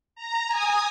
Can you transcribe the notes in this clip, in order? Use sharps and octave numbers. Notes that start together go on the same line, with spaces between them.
A#5
G#5 D#6